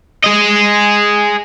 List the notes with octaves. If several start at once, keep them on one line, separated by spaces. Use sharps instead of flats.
G#4 D#5